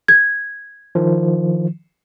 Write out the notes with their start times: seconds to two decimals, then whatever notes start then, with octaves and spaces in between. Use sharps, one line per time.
0.08 G#6
0.95 D#3 F3